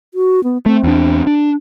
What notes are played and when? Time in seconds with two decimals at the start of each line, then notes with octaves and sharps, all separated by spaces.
0.14 F#4
0.44 B3
0.66 A3 C4
0.84 E2 D4
1.27 D4